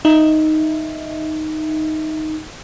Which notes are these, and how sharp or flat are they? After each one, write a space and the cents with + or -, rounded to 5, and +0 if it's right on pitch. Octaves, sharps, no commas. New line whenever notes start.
D#4 +0 E5 +0